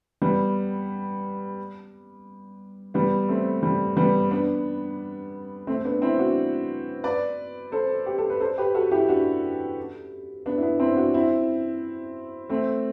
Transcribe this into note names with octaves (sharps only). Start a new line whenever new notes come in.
G3 B3
G3 B3
A3 C4
G3
G3 B3
B3 D4
A3 C4
B3 D4
C4 E4
D4 F#4
B4 D5
A4 C5
G4
A4
B4
A4 C5
G4 B4
F#4 A4
E4 G4
D4 F#4
B3 D4
E4
B3 D4
C4 E4
D4 F#4
C4 E4
A3 C4